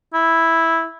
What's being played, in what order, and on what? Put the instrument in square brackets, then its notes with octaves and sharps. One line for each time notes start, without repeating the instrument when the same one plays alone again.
[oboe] E4